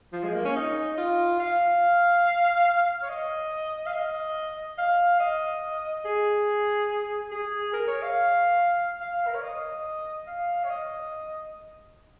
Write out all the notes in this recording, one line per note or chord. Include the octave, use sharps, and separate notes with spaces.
F3
G#3
A#3
C#4
D#4
F4
F5
C#5
D#5
F5
D#5
F5
D#5
G#4
G#4
A#4
C#5
F5
F5
A#4
C#5
D#5
F5
C#5
D#5